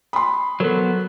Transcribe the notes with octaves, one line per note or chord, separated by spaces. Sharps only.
B5 C6 D#6
F#3 B3 A4 A#4 C5